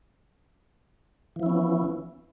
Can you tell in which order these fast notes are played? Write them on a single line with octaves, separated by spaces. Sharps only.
E3 F3 E4 C#4 B3